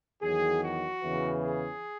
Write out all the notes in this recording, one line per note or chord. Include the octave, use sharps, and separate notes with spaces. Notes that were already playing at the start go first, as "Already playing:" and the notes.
E2 D#3 F#3 G#4
F#4
E2 C#3 E3
G#4